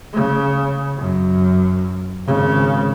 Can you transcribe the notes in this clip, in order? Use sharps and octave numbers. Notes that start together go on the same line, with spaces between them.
C#3
F#2
G#1 C#3